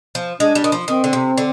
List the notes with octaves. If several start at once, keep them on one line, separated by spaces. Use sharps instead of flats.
F3
G#3 D4
G3
D#3
F3
D#3 C4
D3
C3
D3